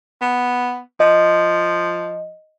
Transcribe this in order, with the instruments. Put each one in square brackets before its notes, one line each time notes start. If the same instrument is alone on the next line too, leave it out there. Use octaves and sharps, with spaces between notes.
[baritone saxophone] B3
[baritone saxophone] F3 [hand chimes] D#5